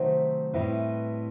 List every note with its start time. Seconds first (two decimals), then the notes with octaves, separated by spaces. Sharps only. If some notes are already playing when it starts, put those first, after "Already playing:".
Already playing: C3 D#3 F#3 A3 C5 E5
0.53 A2 G3 C4 E4 B4 D#5